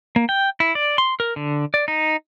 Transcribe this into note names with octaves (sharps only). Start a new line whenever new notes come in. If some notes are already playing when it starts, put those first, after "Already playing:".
A#3
G5
E4
D5
C6
A#4
D3
D5
D#4